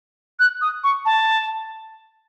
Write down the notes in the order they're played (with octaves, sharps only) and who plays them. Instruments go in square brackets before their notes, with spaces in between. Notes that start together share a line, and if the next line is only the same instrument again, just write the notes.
[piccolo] F#6
D#6
C#6
A5